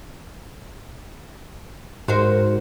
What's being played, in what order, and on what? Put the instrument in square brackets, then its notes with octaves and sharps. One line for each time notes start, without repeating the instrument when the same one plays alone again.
[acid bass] G#2 [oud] F#4 A#4 C5